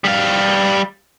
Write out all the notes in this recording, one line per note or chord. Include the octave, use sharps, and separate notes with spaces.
G3 F5